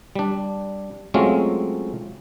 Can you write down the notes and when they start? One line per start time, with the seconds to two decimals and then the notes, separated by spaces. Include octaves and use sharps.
0.15 G3 D4
1.14 F#3 G#3 A3 C4 C#4 F4